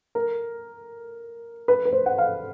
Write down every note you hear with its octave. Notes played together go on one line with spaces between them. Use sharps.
A#4
B4
B4
C5
F#5
F5